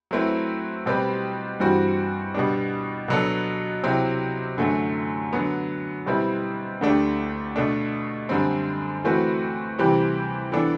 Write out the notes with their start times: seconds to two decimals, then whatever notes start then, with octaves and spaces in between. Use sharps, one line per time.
0.11 F#3 A3 C4 E4 B4
0.86 B2 G3 C4 G4 B4
1.60 G2 E3 G3 C4 F#4
2.34 B2 G3 B3 D4
3.08 B2 F#3 B3 D4 A4
3.83 C3 F#3 C4 E4 G4
4.58 F#2 D3 F#3 A3
5.33 D3 F#3 B3
6.06 B2 G3 C4 E4 B4
6.81 D2 D3 A3 D4 G4
7.56 B2 A3 D4
8.29 F#2 D3 G3 C4
9.04 E3 A3 C4 F#4 B4
9.78 C3 E3 G3 C4 G4
10.52 E3 B3 D4 A4